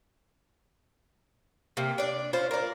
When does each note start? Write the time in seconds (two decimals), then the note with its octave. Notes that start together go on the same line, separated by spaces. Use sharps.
1.77 C3 A#3
1.98 D4 D5
2.33 C#4 F4 C5
2.51 A#4 D5